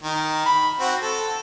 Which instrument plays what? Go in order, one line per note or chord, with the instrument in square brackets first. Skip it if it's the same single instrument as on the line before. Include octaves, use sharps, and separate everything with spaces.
[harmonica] D#3
B5
C4 F#4
A4